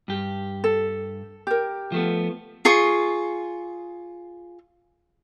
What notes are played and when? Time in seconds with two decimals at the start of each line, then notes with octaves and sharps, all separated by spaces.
0.08 G2 G4
0.64 A4
1.47 G4 A#4
1.92 F3 A3 B3
2.65 F4 G#4 C#6